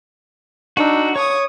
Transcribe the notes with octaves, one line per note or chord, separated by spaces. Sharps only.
D4 D#4 F#4 F#5 E6
C#5 C#6 D#6